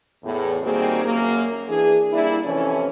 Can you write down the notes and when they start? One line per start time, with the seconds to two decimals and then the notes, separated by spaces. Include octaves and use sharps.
0.24 E2 A2
0.63 D#3 G3 A#3 C4 F#4 G#4
1.05 F#2 A#3 A#4
1.69 E3 D4 G#4
2.13 G3 A#3 D4 E4
2.45 F2 C3 E3 A3 C#4